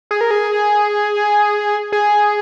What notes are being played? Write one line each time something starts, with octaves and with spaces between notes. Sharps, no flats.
G#4
A#4
G#4
G#4